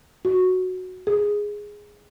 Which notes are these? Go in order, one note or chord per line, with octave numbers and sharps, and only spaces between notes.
F#4
G#4